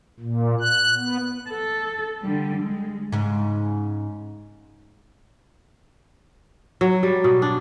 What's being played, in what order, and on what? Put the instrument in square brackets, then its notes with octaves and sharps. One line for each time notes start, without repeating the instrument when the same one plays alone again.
[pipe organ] A#2
F#6
B3
[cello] A4
D3 G3
G#3
[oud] G#2 C#3
[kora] F#3
G3
B2
D4